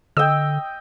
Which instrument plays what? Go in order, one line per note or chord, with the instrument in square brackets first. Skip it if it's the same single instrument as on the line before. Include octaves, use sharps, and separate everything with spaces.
[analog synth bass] D3 [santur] D#5 G5 [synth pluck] E6